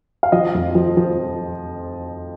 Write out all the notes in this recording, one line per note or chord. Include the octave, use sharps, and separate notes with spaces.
F5
F3 D#5
F2
F3
F3